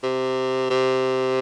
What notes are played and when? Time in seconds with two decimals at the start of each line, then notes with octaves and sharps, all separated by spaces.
0.03 C3
0.70 C3